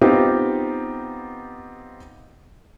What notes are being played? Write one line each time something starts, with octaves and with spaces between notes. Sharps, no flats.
B3 C4 D#4 F4 G4